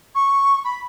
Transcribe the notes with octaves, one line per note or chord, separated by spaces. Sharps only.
C#6
B5